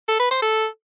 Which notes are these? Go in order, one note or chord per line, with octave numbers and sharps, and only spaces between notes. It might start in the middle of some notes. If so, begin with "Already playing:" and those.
A4
B4
C5
A4